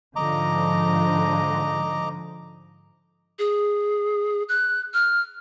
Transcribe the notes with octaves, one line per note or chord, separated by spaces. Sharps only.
G#2 D3 F3 D#5 A#5 D6
G#4
F#6
F6